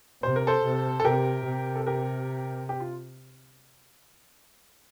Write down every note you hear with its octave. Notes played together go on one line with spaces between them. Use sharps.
C3 C5
A#4
A4 C5
C3
A4
C3 G4 A#4
C3
A4
G4 A#4
G4
F4